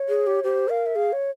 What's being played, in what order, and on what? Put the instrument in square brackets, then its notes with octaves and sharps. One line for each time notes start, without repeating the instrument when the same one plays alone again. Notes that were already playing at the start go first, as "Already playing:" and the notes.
Already playing: [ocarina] C#5
[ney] G#4
G4
[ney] G4 [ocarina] C5
[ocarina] A#4 [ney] F5
[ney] E5
[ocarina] G#4 [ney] F5
[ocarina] C#5